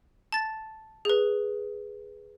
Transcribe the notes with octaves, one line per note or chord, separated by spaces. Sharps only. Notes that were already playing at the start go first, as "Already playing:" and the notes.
A5 A6
G#4 B4